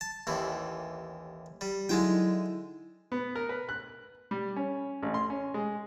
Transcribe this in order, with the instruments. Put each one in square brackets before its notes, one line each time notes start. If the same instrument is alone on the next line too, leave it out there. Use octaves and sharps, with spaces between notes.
[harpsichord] A5
A1 D#2 E3
G3
[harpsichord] D3 G#3 G5 [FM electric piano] F#3 D#4 E4
[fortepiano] B3
A#4
B4
F#6
G3
C#4
A1
C6
C#4
G#3